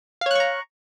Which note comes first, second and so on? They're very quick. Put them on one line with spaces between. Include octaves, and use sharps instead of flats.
F5 C#5 F#6 C#6 A#5